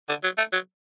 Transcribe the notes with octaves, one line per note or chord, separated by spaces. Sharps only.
D3
F#3
A3
F#3